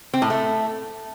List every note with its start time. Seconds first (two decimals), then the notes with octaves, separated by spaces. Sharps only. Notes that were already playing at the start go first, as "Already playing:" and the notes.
0.14 C4
0.22 A2
0.30 A3